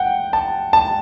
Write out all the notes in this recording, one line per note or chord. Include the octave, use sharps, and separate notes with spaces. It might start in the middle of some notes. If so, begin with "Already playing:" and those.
Already playing: F#5 G5
A5
A5